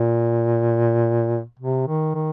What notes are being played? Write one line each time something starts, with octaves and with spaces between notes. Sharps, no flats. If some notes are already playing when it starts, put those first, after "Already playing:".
Already playing: A#2
C3
D#3
D#3